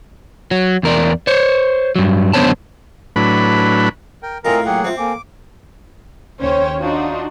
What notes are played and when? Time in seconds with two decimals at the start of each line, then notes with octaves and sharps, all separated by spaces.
0.51 F#3
0.83 E2 A#4 D5
1.27 C5 C#5
1.96 G2 F#3
2.33 F#2 D3 B3 C5 C#5 A5
3.16 A2 F#3 D4 B4 B5
4.23 A#4 G5
4.45 A2 C4 F4 A#4 D#5 G#5 A#5
4.66 F#3 A#3 G#4 A4 F#5 G5
4.84 C4 F4 E5
4.97 A#3 A4 G#5 D6
6.40 D#2 C#3 C#4 C5 C#5 G5
6.80 D4 D#4 F4 F#4